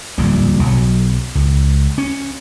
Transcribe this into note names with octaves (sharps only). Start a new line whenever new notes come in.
D1 A#1 E2 G3
B1 F#3
C#2
C#4